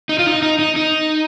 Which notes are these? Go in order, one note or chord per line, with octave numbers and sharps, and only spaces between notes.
D#4
F4
D#4
D#4
D#4
D#4